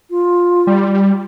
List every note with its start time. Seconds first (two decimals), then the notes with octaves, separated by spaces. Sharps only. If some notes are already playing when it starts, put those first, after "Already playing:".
0.10 F4
0.67 G3